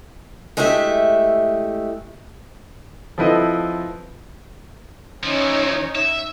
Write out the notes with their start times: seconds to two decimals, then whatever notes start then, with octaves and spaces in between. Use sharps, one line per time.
0.57 G#3 A3 E4 G4 E5
3.18 F3 C4 E4 A4 B4 D#5
5.23 E3 F3 C#4 D#4 C#5
5.96 E5